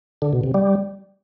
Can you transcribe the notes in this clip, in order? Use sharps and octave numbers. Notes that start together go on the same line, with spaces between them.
D3
B2
C3
G3